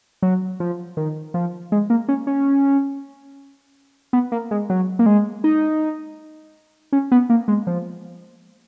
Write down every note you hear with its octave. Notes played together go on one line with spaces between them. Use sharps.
F#3
F3
D#3
F3
G#3
A#3
C#4
C#4
B3
A#3
G#3
F#3
A#3
G#3
D#4
C#4
B3
A#3
G#3
F3